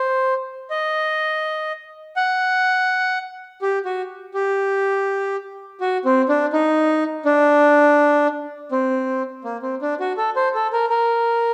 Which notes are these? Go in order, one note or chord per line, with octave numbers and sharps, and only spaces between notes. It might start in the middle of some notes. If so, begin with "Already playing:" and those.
Already playing: C5
D#5
F#5
G4
F#4
G4
F#4
C4
D4
D#4
D4
C4
A#3
C4
D4
F#4
A4
C5
A4
A#4
A#4